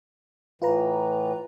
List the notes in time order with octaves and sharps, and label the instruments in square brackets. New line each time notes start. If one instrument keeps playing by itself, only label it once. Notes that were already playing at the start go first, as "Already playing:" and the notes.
[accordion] A2 E3 [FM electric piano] F4 B4 A#5